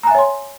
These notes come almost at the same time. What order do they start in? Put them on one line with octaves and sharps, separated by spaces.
A#5 G#5 E5 C#5 C6